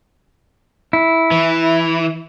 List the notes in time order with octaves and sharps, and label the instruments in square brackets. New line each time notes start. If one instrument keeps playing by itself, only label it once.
[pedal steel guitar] E4
[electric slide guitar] E3